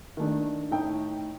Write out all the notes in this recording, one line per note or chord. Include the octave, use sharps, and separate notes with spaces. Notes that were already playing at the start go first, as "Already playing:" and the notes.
D#3 A3 D4
A2 A3 D#4 G5